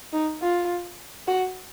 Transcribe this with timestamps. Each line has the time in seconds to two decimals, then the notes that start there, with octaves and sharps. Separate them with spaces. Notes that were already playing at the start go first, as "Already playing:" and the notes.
0.13 D#4
0.42 F4
1.28 F#4